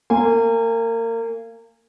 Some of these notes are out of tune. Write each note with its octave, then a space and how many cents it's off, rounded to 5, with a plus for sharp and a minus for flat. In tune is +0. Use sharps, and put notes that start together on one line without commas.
A#3 -30 G#5 -15